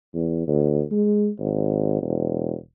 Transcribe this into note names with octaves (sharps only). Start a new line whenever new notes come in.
E2
D2
G#3
G#1
E1